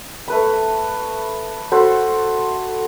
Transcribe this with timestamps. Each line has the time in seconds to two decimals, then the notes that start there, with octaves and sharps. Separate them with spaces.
0.28 A3 B4 B5
1.72 F#4 A4 C5 B5